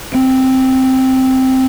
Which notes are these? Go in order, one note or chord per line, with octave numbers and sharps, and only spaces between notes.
C4